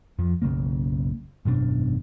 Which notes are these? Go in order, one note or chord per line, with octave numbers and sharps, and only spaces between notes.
F2 F3
F#1 B1 C#3 A#3
G#1 F#2 B2 D4